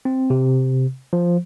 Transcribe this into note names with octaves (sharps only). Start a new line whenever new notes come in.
C4
C3
F3